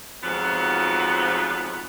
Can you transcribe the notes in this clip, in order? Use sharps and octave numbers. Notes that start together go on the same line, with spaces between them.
F2 G#2 F3 F#3 B3